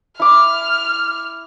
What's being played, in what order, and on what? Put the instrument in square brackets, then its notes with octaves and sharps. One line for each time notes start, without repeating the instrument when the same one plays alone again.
[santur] E4 D6 [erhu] F6